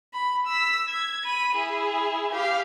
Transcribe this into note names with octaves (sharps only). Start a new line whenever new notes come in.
B5
E6 B6
G#6
B5 D#7
E4 G#4
G4 F5